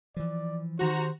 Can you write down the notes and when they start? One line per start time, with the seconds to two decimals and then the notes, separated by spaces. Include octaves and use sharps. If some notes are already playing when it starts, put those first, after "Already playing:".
0.17 E3 F3 D5
0.79 D#3 F#4 G4 C5 A#5